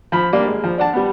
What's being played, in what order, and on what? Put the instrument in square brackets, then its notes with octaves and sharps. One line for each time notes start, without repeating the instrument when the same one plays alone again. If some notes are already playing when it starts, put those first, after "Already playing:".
[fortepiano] F3 B5
G3 A#3 D4
G#3
F3
D4 F#5 A5
G3 B3